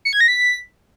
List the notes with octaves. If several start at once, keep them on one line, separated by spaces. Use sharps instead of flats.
C#7
G#6
A#6
B6